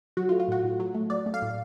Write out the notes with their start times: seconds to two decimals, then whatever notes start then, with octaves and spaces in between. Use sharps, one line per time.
0.17 F#3 F#4
0.29 F4
0.32 A3
0.40 F4
0.48 A2 F#4
0.64 A2
0.80 F#3
0.95 A3
1.10 F#3 D5
1.26 A3
1.34 F5
1.42 A2